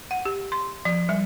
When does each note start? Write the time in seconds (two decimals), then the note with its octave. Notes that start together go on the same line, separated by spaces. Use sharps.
0.11 F#5
0.25 G4
0.52 C6
0.85 F3
1.09 G3